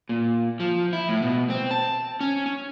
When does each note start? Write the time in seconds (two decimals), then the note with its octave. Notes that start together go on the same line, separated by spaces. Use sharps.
0.09 A#2
0.60 F3
0.93 E4
1.09 A2
1.22 B2
1.50 C4
1.71 A5
2.21 C#4
2.46 C#4